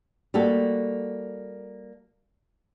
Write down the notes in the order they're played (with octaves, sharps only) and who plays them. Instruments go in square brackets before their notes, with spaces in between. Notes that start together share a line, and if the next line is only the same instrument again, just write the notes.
[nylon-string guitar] G3 A#3 F#4 A4